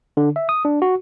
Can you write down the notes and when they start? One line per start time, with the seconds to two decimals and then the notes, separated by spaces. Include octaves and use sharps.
0.17 D3
0.36 E5
0.49 D#6
0.65 D4
0.82 F#4